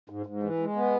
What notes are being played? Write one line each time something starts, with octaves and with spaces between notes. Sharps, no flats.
G#2
G#2
E3
G#3
B3